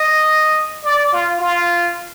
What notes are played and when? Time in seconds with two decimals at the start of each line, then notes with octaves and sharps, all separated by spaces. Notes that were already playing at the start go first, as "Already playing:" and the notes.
Already playing: D#5
0.84 D5
1.12 F4
1.40 F4